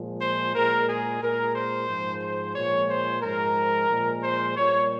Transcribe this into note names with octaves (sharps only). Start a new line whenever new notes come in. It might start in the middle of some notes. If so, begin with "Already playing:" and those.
Already playing: A#2 F3 G#3
C5
A#2 G#3 A#4
G#4
A#2 G#3 A#4
C5
G#2 F3 G#3
C5
A#2 F3 G#3 C#5
C5
G#2 F3 G#3 A#4
A#2 F3 G#3
C5
A#2 G3 C#5